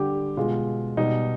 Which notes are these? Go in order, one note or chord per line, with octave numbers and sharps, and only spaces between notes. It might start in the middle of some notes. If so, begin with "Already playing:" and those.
Already playing: D3 G3 G4
B2 G#3 F4
B2 G3 D#4